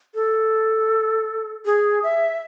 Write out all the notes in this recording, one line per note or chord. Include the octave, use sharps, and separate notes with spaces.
A4
G#4
E5